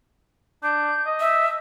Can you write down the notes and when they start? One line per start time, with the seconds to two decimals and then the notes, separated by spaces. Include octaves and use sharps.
0.63 D4 G6
1.06 D#5
1.20 E5